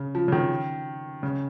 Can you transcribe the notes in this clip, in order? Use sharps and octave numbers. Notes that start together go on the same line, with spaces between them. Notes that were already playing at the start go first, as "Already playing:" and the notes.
Already playing: C#3
F3
C#3
D#3
C#3